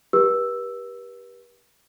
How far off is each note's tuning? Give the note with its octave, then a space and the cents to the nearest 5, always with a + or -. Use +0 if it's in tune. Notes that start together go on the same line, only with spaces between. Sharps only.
G4 +0 B4 -40 E6 +0